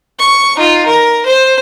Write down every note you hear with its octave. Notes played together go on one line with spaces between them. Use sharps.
C#6
D#4 F4
A#4
C5